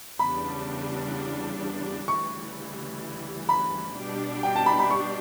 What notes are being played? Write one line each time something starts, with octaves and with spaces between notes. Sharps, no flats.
E2 C#3 G3 D4 B5
D2 C#3 E3 G3 C#6
B5
B2 G3 D4 G4
G5
A5
B5
B5
C#6